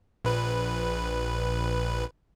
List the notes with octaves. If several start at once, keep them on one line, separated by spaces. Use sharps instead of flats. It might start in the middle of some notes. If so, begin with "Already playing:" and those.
A#1 B4